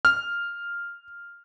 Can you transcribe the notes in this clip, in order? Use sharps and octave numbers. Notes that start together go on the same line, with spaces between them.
F6